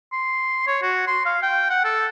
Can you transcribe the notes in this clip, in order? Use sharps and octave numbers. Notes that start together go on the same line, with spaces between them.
C6
C#5
F#4
C6
F5
G5
F#5
A4